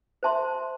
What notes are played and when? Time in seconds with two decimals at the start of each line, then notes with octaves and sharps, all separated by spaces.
0.23 C5 E5 A5 C6